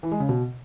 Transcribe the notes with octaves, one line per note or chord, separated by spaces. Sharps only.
E3
G#3
C#3
B2